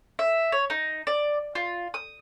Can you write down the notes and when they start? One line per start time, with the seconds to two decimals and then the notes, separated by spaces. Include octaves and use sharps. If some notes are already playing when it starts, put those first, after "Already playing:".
0.19 E5
0.52 C#5
0.70 D#4
1.07 D5
1.55 F4
1.94 D#6